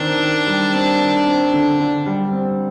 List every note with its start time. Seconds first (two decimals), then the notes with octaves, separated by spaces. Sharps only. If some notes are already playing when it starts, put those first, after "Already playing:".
Already playing: D#3 C4 D4
0.20 D#3
0.47 G3
0.73 C4
1.00 D#3
1.26 C4
1.53 D3
1.80 D3
2.06 G3
2.32 C4